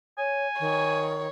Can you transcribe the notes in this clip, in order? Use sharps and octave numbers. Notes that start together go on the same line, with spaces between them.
C#5 G#5
D#3 C#5